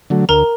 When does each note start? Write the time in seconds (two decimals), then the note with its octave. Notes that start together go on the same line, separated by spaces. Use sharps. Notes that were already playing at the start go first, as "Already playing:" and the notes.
0.10 D3 F#3 A3
0.29 D2 A#4 A#5